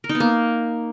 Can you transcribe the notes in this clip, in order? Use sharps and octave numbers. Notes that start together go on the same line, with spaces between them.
A#4
D#4
B3
A#3